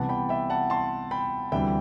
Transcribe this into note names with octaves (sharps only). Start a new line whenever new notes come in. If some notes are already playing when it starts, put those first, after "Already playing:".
Already playing: C2 C3 E3 B3 F#5 A5
G5 B5
E5 G5
F#5 A5
A5 C6
G5 B5
D2 C3 E3 G3 E5 G5